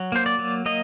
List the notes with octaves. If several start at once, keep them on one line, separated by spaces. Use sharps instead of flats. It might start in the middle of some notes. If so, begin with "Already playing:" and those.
Already playing: F#3
A#3 C5
D5
F#3
A#3 D#5